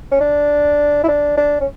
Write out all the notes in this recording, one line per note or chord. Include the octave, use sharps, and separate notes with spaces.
C#4
D4
E4
D4
D4
C#4